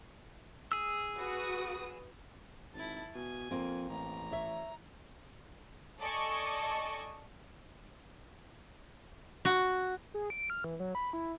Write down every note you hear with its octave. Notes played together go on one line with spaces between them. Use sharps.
G#4 E6
F#4 B4 D#6
G#1 E4 A5
B2 G#5
F2 A#3 C4
A1 A#5
C#5 E5
A4 D5 D#5 G#5 A5 C#6
F#4
G#4
D7
F6
E3
F#3
B5
E4